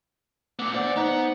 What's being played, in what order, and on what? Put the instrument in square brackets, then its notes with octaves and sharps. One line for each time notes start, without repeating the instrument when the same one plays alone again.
[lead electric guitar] A#2 B3 [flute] D6
[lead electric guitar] D3 D5 [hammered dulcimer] C5 [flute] F#5
[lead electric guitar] B3 [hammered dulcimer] D#4